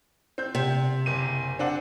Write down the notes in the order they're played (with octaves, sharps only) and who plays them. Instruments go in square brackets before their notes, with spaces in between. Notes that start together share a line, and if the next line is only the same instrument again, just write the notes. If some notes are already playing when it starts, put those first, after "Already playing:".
[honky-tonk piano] C4 G6
[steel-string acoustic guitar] C3
[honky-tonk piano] F#1 D#7
C4 D4 F#5